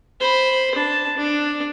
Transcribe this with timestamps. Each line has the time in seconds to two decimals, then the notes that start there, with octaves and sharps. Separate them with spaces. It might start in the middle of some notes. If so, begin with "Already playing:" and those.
0.20 C5 B5
0.75 D4 A5
1.17 D4